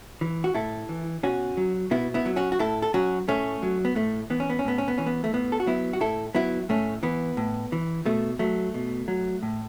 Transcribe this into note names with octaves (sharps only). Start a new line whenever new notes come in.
E3
F#4
A2 E4 A4
E3
B2 C#4 F#4
F#3
B2 B3 E4
B3 E4
F#3
C#4 F#4
F#4
A2 E4 A4
A4
F#3 C#4 F#4
A2 A3 C#4
F#3
B3
A2 A3
E3 B3
C#4
B3
C#4
A2 B3
C#4
B3
E3 C#4
B3
A3
A2 B3
A4
F#4
F#3 B3 E4
F#4
A2 E4 A4
F#3 B3 E4
A2 A3 C#4
E3 B3
A2
E3
B2 A3
F#3 A3
B2
F#3
A2